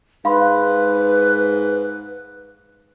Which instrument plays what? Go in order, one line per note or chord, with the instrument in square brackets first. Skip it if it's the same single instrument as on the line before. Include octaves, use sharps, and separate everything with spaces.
[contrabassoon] G#2 [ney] B4 [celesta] F5 B5 C6